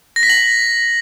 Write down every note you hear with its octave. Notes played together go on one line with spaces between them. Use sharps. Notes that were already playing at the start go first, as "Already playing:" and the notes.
A#6
B6
F#7